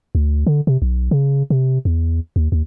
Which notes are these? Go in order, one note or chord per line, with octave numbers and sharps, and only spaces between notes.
D2
D3
C3
B1
C#3
C3
E2
D#2
D#2